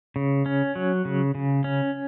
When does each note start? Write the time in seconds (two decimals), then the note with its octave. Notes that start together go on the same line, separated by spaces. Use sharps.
0.16 C#3
0.46 C#4
0.76 F#3
1.05 C#3
1.35 C#3
1.64 C#4